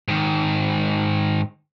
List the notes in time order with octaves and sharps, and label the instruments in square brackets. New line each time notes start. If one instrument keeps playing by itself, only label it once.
[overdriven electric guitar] G#2 D#3